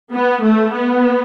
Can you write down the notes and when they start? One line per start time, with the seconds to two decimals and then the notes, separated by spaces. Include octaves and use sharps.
0.13 B3
0.43 A3
0.74 B3